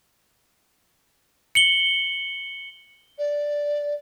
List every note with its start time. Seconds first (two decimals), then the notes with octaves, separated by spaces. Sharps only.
1.55 C#7 F#7 G7
3.18 D5